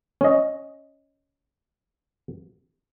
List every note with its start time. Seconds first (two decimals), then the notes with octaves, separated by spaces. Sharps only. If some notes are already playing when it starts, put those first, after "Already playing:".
0.21 C#4 D#5